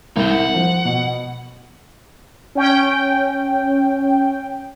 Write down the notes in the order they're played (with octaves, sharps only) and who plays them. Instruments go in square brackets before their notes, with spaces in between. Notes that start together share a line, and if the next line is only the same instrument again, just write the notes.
[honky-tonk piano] C2 [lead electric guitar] G3 D#4
[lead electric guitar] F#5
[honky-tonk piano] F3
B2
[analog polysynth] C#4 G5